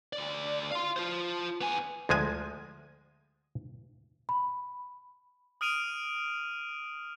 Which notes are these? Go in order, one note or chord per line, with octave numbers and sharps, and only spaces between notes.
D2 D5
F5 C6
F4 C5
B3 G#5
D2 F3 G#3 G#5
B5
D#6 F6 D7 D#7 F7